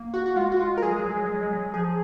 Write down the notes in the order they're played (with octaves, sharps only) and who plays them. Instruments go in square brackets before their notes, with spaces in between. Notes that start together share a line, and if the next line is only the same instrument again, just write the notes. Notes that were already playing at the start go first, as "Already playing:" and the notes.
Already playing: [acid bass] A#3
[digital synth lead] F#4
F#4
[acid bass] G#3 [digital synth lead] F4
[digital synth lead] F#4
F4
A#4
[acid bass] F#3 [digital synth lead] G#4
[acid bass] G#3
F#3
G#3
F#3
G#3
F#3
G#3
F#3
[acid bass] F3 [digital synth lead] G#4